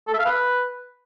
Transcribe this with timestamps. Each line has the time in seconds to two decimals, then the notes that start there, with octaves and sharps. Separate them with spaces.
0.07 A4
0.13 E5
0.19 F5
0.25 B4